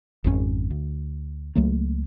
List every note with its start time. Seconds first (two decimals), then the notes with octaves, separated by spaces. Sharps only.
0.24 G#1 F2 B2 C#4
0.70 D2
1.55 C#2 F#3 A3 A#3